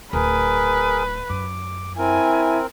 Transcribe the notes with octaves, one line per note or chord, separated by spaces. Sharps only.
D1 G#4 A#4 B4
F#2 D6
C4 E4 A#4 G#5